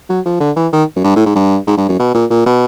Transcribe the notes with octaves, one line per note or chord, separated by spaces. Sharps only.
F#3
F3
D3
E3
D#3
F#2
G2
A2
G#2
G2
G#2
G2
F#2
B2
A#2
A#2
B2